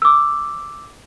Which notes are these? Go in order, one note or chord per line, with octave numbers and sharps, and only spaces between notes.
D6 E6